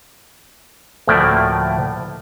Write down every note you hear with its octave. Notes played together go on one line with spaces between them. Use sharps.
D2 A2 F3 A3 A#3 D5